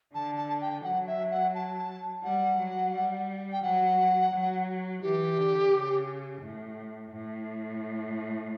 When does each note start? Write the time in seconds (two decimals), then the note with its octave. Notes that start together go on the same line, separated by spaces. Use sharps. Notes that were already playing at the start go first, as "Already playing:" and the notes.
0.14 D3 A5
0.38 A5
0.62 G5
0.84 F#3 F#5
1.07 E5
1.31 F#5
1.55 A5
2.23 G3 F#5
2.59 F#3
2.94 G3
3.52 G5
3.63 F#3 F#5
4.33 F#3
5.02 E3 G4
5.37 D3
5.72 C#3
6.41 A2
7.11 A2